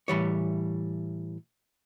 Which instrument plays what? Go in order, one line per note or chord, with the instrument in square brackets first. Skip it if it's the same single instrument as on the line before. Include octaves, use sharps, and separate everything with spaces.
[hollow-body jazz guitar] A2 E3 G3 C#5